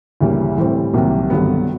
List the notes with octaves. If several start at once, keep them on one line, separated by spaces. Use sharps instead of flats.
D2 C#3 E3 G3 A#3
A2 E3 G3 C4
C2 C3 D#3 F#3 A#3
G#1 G2 D3 F#3 B3